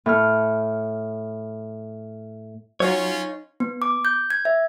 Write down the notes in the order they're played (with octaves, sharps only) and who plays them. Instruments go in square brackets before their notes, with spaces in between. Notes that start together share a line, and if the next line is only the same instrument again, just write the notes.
[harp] A2 F6
[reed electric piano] F#3 [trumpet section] C#4 F4 [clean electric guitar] D#4 C#5
[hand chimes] B3
D6
G6
G#6
E5